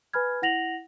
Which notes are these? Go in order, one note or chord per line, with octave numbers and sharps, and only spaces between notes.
B4 G#5 B5 F6 G#6
E4 F#5 A#6 F7 F#7